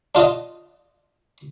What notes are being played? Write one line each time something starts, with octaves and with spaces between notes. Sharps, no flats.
D4 F4 D#5